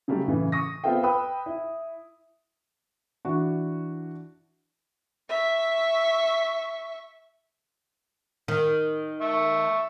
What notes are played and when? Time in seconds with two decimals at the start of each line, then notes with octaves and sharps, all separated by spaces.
0.08 C#3 F#3 G3 A3 C#4 G4
0.27 A2 C#3 E3
0.52 C#6 D#6 A#6
0.84 B3 C4 F4 A4 E5 G5
1.03 B4 G5 B5 D#6 E6
1.46 E4
3.25 E3 D4 F#4
5.29 E5 C#6
8.48 D#3
9.21 E5 C#6